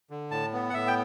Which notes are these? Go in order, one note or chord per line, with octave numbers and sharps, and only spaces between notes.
D3
A2 A5
B3
F#5
A2 E5
G5